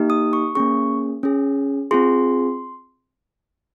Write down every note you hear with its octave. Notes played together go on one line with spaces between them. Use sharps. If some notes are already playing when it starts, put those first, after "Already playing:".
Already playing: A#3 D#4 G4
D#6
C#6
A#3 C#4 G#4 C#6
C#4 G#4
C4 F4 G#4 C6